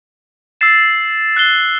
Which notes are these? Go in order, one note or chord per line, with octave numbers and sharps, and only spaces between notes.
E6 A6 C7 E7
F#6 C7 G7